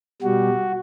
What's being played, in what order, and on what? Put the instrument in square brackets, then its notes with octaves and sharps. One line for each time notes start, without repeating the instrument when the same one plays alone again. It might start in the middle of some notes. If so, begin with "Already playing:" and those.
[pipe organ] B2 G3 F#4